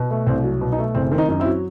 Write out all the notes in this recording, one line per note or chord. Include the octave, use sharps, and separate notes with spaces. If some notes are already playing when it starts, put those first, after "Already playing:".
Already playing: B2
A3
C2 C4
F#3
B2
D#4
A3
F#1 C4
D#3 C4
D#4
F#2 D#4
C4 E4
F#3